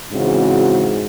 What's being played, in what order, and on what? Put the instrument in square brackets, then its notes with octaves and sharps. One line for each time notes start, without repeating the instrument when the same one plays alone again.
[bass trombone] G#2 [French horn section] C#3 E3 C4 F#4